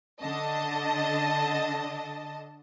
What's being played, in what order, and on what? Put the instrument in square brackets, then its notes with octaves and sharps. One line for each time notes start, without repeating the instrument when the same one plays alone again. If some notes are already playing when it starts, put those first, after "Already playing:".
[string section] D3 D#5 A5